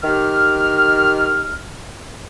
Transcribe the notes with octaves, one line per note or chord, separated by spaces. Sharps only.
D#3 G4 F6